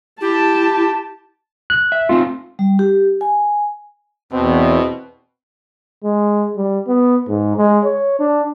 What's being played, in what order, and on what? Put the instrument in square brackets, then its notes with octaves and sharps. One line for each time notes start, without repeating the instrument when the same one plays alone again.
[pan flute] E4 [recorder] G4 [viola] A5
[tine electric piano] F#6
[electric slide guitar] E5
[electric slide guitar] A3 C4 D#4 [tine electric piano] F4
[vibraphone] G3
G4
G#5
[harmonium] E2 [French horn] B2 [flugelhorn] C4
[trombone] G#3
G3
B3
G#2
G#3
C#5
D4